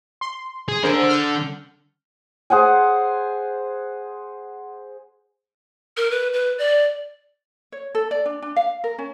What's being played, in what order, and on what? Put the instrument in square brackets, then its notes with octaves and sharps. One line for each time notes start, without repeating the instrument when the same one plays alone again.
[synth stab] C6
[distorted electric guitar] G#4
[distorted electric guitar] D3 [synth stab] G#4 A#4 C5
[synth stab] F6 G6
[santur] G#4 C5 F#5 G#5
[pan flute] A#4
B4
B4
D5
[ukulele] C#5
A4
D5
D4
D4
F5
A#4
C#4